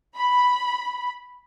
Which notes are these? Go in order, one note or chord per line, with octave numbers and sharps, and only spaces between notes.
B5